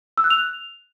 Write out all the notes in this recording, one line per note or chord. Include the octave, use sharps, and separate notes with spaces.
E6
F#6
F7